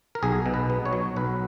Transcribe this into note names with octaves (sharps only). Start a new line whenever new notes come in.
A#4
B1 G#4
B2
B4
B3
C#5
F#3
B1 B4